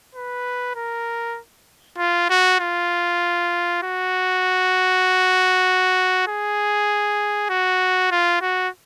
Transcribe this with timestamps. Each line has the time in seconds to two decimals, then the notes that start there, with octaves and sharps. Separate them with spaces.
0.15 B4
0.75 A#4
1.98 F4
2.30 F#4
2.60 F4
3.83 F#4
6.28 G#4
7.50 F#4
8.11 F4
8.41 F#4